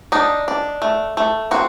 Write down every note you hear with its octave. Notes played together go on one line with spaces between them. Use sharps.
D4 D#4
D4
A3
A3
C4 F#4